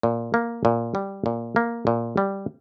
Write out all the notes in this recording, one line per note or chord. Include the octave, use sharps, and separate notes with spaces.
A#2
A#3
A#2
G3
A#2
A#3
A#2
G3